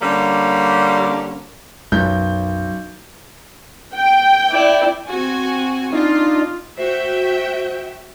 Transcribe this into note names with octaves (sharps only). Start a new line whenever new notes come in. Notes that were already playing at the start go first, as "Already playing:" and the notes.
D3 G3 A#3 C#4
B1 F#2 G6
G5
E4 D5
C4 F#4 G#5
D4 D#4 F4
F#4 C5 E5 G5